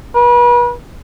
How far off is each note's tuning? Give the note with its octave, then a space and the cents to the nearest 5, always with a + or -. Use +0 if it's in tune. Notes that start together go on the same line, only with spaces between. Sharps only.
B4 -35